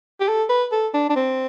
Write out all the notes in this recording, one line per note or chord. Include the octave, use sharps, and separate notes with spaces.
G4
A4
B4
A4
D4
D4
C4